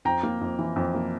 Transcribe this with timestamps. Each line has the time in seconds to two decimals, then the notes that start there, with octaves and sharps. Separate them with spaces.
0.05 F2 G5 A#5
0.23 A#3
0.41 F2
0.59 E3
0.76 F2
0.95 A#3